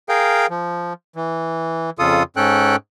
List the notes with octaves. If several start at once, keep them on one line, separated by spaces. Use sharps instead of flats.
G#4 A#4 F5 G5
F3
E3
F2 C#3 F4 A4 D#6
G#2 C#4 A4 G5 F#6